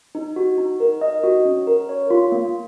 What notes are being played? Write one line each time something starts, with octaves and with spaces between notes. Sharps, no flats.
D#4
F#4
D#4
A#4
D#5
F#4
C#4
A#4
C#5
F4
A#3